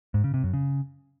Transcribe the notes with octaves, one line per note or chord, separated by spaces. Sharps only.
G#2
C#3
C3
F#2
C#3